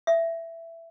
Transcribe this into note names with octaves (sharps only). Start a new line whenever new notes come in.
E5